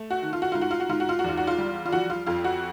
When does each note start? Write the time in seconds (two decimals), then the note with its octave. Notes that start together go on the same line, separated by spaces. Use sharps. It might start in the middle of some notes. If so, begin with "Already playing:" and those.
Already playing: A3
0.11 F#4
0.22 D#3
0.33 F4
0.42 F#4
0.52 G#2 F4
0.61 F#4
0.71 F4
0.80 F#4
0.89 G#2 F4
1.00 F#4
1.09 F4
1.19 F#4
1.24 E2 F4
1.37 F#4
1.47 F4
1.58 G3
1.86 F4
1.92 F3 F#4
2.10 F4
2.26 F2 F4
2.44 F#4